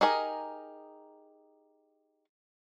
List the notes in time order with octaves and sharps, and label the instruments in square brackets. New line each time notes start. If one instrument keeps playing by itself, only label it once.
[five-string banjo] D#4 G4 G#4 A#4 D#5